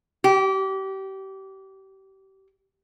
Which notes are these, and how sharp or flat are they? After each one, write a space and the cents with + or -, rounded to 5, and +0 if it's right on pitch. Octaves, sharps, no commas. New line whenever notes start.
G4 -30